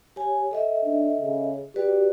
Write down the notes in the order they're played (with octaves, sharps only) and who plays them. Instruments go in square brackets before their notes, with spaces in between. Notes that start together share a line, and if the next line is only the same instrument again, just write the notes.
[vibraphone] G4 C#5 G#5
A4 D#5 E5
[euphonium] D4
C#3
[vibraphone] F#4 B4 D5 [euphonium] G4